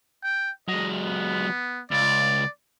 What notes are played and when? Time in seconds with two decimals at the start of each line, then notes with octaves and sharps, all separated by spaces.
0.24 G5
0.68 F#3 G#3 D#5
1.03 B3
1.91 C#2 D5